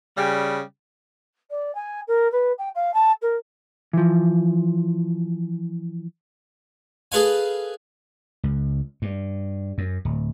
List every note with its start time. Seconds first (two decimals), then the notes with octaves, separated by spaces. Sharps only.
0.17 C#3 G3
1.50 D5
1.75 G#5
2.07 A#4
2.32 B4
2.58 G5
2.75 F5
2.94 A5
3.22 A#4
3.93 E3 F3
7.12 G#4 A4 B4 F5 G#5
8.43 C#2
9.02 G2
9.78 F#2
10.05 D1